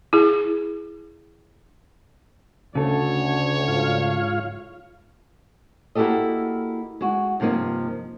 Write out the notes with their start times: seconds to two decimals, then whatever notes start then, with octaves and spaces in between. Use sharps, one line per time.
0.13 E4 G#4
2.75 D2 C#3 A4 C#5
3.68 G#2 F4 F5
5.95 A#3 E4 F#4 G4 A4 D#5
7.01 G#3 F#4
7.40 G2 C3 F3 A#3 D#4